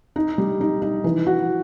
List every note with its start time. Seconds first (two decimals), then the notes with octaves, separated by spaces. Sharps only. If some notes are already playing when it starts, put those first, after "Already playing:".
0.16 D#4
0.38 G3
0.61 D#4
0.82 D#4
1.04 E3
1.27 F#4